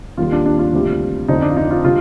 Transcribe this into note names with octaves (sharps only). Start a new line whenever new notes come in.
D#2 D#3 G3 F4
D4
D4
F4
D2 C3 G3
F2 D3 F3 D#4
D4
F4
D#4
F4
D3 G3 F4